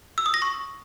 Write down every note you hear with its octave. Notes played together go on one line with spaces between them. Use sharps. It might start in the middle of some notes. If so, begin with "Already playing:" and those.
E6
D#6
A#6
C#6